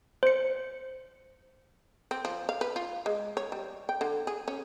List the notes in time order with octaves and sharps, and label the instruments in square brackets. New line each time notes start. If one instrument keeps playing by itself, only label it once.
[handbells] C5 C#7
[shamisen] C4
F3
F5
B4
F4
G#3
C#5
G3
G5
D3
G#4
C#4